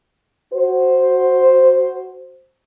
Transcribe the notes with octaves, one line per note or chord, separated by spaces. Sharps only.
F#4 C5